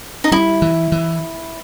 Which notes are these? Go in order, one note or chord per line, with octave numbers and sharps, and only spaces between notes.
D#4
G3 E4
E3
E3